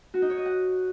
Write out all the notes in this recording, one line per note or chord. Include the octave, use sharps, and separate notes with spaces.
F#4
D#4
C#5
D#5
F#5